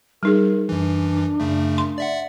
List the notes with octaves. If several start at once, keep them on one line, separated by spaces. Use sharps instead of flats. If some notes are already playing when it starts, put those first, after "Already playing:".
G3 D#4 G#4 A#4
F#2 E3 D4
F#2 C#3 A3
C6
D5 E5 F#5